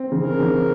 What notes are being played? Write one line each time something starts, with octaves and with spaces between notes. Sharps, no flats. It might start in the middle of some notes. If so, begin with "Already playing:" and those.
Already playing: C4
C#3
A#4
C#3